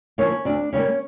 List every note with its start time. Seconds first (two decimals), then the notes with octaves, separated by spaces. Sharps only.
0.18 D3 F3 A#3 C#4 C#5
0.45 D2 D4 D5
0.73 C#3 G3 A#3 C#4 C#5